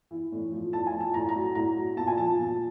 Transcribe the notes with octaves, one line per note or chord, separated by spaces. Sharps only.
E3
A2
F3
A2 A5
G#5
F3
A5
A2 A#5
A#5
F#3
A2 A#5
F#3
A#2 A5
G#5
F3 A5
A#2